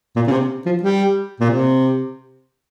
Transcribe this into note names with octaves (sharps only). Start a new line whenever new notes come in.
A#2
C#3
C3
F3
G3
A#2
C3